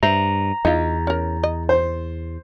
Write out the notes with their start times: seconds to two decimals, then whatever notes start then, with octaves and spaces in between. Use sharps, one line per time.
0.03 G2 C5 E5 A#5
0.65 E2 D#4 F4
1.07 C#4 A#4
1.43 D#5
1.69 C5